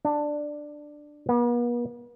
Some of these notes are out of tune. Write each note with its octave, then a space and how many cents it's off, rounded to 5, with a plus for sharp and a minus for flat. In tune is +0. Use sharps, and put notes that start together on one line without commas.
D4 +10
B3 -45